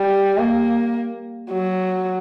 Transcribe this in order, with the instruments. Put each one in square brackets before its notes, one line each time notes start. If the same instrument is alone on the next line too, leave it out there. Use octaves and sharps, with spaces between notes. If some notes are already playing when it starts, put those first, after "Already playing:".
Already playing: [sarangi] G3
A#3
F#3